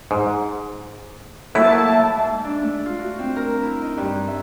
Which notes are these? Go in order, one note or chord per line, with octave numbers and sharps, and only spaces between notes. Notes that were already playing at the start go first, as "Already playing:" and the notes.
G#2
F#3 A3 A#3 E4 E5 A5
G#2
D4
A3
F4
F#4
C4
A#4
E4
D#4
G2
E5